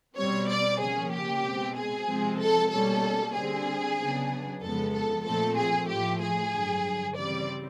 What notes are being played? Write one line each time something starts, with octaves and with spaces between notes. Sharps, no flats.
B2 G3 C4 C#5
D5
C#3 F3 A#3 C#4 G#4
G4
B2 G#3 C4
G#4
C3 F3 G#3 C4
A4
B2 G3 A#3 C#4 A4
D3 G3 C4 G#4
C#3 F#3 B3 D4
F2 C#3 F3 G#3 B3 A4
A4
A#2 F3 A3 C4 A4
G#4
A2 F3 A3 G4
G#4
G2 D3 F#3
C#3 E3 G3 C4 D5